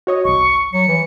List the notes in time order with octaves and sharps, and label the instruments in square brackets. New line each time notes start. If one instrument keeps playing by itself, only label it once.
[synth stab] F#4 C#5 D#5
[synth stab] G1 C2 [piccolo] C#6
[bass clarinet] F#3 [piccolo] C#7
[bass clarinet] E3